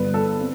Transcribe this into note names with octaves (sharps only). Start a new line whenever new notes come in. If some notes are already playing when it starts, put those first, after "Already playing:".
Already playing: G1 G2 D3 B4
A4
C4